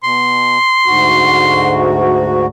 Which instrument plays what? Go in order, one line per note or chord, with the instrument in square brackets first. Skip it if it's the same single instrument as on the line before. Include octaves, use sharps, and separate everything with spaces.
[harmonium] B2 [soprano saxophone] C6
[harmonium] D2 G#2 F#4